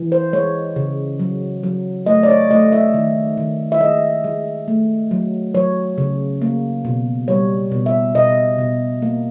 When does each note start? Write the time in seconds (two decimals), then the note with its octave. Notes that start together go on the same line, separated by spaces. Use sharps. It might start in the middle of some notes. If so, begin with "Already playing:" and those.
Already playing: E3
0.12 C5
0.33 G#3 C#5
0.76 C#3
1.20 F#3
1.63 F#3
2.06 A3 D#5
2.23 D5
2.28 C#5
2.50 A3 D#5
2.72 E5
2.94 D#3
3.37 D#3
3.72 E5
3.81 G#3 D#5
4.24 G#3
4.68 A3
5.11 F#3
5.54 F#3 C#5
5.98 C#3
6.42 A#3
6.85 B2
7.28 G3 C#5
7.72 B2
7.86 E5
8.15 B2 D#5
8.58 B2
9.02 A#3